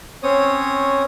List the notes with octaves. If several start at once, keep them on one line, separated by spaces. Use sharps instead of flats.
C4 C#4 C#5 D#6